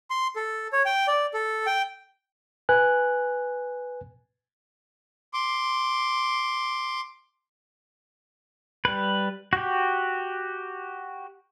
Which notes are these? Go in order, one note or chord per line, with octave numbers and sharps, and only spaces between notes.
C6
A4
C#5
G5
D5
A4
G5
B4 G#5 F#6
C6 D6
G3 B4
F#4 G4